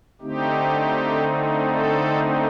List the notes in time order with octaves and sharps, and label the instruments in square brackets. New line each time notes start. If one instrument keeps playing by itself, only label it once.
[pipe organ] D3 A3 C4 D#4 G4
A4